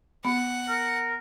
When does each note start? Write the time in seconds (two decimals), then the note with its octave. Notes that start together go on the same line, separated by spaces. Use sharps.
0.25 B3 F#5
0.68 A#4